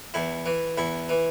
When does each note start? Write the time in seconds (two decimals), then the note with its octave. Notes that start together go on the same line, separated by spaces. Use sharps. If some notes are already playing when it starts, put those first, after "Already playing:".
0.14 E2 E4
0.46 E3
0.78 E2 E4
1.09 E3